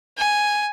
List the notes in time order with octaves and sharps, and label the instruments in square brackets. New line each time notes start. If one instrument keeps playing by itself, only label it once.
[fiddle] G#5